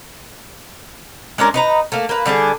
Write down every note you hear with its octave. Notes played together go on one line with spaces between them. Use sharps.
G#3 C#4 D4 A#4
D#4 B4 A#5
A3 A#3
A#3 B4
D3 G3 D4 G#4